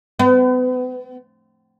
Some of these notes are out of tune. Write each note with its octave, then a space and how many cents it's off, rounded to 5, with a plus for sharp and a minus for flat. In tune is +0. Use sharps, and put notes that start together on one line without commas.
B3 +40